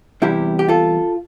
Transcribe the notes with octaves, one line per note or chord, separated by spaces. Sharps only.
E2 C3 G3 E4 G4
G4
F4 A4